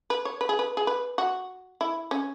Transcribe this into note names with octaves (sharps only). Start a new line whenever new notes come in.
B4
C#5
B4
G#4
B4
G#4
B4
F#4
E4
C#4